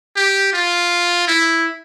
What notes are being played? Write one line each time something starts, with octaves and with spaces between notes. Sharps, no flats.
G4
F4
E4